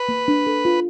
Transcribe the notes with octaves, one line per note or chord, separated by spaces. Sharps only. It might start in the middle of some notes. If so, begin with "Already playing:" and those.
Already playing: B4
A#3
D4
A4
F4